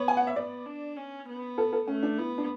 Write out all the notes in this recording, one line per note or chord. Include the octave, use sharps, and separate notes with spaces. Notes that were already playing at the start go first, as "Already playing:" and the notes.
Already playing: B3 C#5
G#5
F#5
E5
B3 D5
D4
C#4
B3
A4
A4
A3 C#4
D4
B3 E4
D4